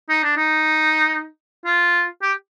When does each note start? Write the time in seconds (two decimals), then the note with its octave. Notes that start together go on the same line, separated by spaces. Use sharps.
0.09 D#4
0.23 D4
0.37 D#4
1.66 F4
2.22 G4